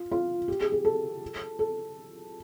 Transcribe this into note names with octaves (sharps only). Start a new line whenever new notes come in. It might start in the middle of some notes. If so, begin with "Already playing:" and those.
Already playing: F4
F4
G4
G#4
G#4
A4
A4